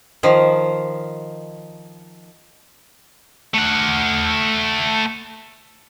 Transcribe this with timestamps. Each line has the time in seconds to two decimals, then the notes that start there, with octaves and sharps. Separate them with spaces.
0.23 D#3 F3
3.54 A3 F#5